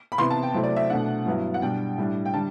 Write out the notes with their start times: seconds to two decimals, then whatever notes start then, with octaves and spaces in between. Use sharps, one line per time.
0.12 B5
0.18 C3 E3 B3 E4 C6
0.30 A5
0.43 G5
0.54 C3 F#3 A3 C4 E4
0.63 D5
0.76 E5
0.90 B2 A3 D4 F#5
1.26 G2 F#3 B3 E4
1.54 F#5
1.62 B2 G3 D4 G5
1.98 A2 G3 D4
2.25 G5
2.33 D3 G3 A5